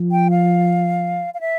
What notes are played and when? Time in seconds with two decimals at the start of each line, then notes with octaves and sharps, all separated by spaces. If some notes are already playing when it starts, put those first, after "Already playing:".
Already playing: F3
0.12 G5
0.31 F5
1.34 F5
1.41 E5